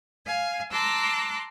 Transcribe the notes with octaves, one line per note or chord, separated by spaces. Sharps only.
F5 G#5
A5 A#5 C6 D6 E6 F#6